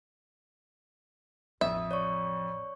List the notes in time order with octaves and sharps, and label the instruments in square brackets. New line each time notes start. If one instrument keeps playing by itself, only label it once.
[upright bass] A1 [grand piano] F2 [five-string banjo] E5 [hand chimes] D#6
[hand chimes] C#5 D5 C#6